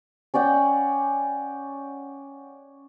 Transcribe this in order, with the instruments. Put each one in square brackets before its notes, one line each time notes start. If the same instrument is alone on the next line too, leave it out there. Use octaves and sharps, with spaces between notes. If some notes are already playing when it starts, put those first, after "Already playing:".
[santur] C#4 D5 F#5 G5